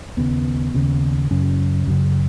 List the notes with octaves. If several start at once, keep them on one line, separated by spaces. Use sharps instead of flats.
D#2 C#3 B3
D#2 C#3
F#2 C#3 C#4
F#2 C#3